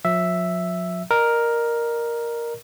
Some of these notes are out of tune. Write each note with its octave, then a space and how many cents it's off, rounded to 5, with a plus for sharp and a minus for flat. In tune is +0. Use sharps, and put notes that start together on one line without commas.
F3 +45 E5 +0
A#4 +5 D#5 -35